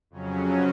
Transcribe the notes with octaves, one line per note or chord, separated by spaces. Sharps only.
F2 C#3 F#3 C#4